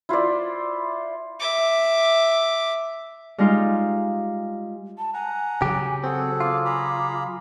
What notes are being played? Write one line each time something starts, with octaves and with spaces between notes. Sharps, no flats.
E4 F4 C5 D5
E5 D6
G3 G#3 D#4 F4
A5
F#5 G#5 A#5
C#3 F#3 G4
C4 F#4 G#4 A4 F#5
F4 D6
G#4 A#5 B5 D6